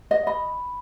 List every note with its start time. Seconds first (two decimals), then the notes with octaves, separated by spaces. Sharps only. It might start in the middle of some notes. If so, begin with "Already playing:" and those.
0.11 D#5
0.27 D#5 B5